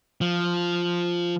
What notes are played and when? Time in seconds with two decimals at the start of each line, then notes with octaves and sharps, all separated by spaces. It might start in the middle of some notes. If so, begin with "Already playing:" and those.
0.21 F3